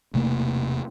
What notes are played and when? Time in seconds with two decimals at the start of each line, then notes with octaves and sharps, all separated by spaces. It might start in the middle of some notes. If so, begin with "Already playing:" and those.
0.14 E1 C3 A3 A#3